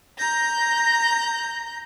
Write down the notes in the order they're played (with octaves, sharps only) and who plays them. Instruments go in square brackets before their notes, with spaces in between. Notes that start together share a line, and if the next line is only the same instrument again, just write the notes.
[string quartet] A#5 G6 A#6